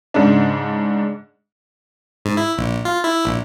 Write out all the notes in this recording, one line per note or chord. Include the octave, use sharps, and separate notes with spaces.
G#2 C#3 D4
G#2
E4
A#1
F4
E4
A#1